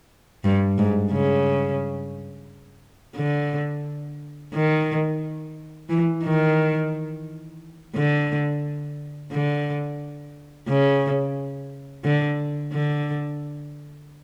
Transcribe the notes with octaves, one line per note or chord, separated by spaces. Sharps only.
G2
G#2
C#3
D3
D#3
E3
D#3
D3
D3
C#3
D3
D3